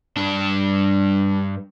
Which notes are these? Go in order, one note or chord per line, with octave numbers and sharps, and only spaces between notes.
G2 D4